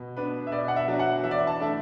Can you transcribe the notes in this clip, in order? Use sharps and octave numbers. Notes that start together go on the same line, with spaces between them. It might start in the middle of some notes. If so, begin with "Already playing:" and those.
Already playing: B2
B3 D4 B4
E5
B2 D5
F#5
E5
F#3 D4 F#4 D5
F#5
E3 E5
D5
E5
A5
A3 D4 E5